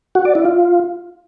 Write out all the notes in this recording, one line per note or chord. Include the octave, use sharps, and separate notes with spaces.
F#4
D5
E4
F4